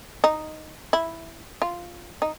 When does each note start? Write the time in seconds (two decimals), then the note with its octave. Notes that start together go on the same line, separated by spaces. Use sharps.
0.24 D#4
0.93 E4
1.62 F4
2.22 D#4